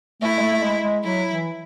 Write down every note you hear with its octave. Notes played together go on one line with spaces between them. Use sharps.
A3 E4
G#3
A3
A3
G#3
G#3
F#3 E4
E3